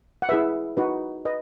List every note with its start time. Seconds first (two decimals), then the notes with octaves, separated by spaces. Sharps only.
0.22 F#5
0.29 E4 G#4 B4 E5
0.77 D#4 F#4 B4
1.25 B4 D#5